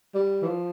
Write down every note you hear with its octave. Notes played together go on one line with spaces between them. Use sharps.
G3
E3
F3